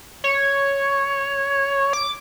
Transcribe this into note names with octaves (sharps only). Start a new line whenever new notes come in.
C#5
D6